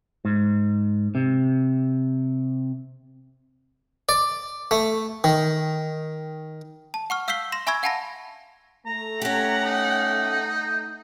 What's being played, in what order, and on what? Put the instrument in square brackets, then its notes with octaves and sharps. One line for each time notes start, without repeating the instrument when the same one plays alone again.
[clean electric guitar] G#2
C3
[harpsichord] D5
A3
D#3
[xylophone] A5
F#5 C#6 F6
F5 E6 G6 B6 C7 G7
C6 A#6 E7
E5 G#5 B5 C#6 E6 G#6
F5 F#5 G#5 A5 B5 A#6
[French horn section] A3 [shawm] A#5
[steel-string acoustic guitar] C#4 G4 [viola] F#5
[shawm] D#4